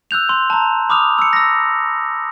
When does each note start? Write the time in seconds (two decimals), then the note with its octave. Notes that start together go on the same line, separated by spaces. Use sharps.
0.11 E6 F#6 G6 F7
0.29 C6
0.50 A5 A#5
0.89 B5 D6 D#6 F6 F7
1.19 E6 C#7
1.33 E6 A#6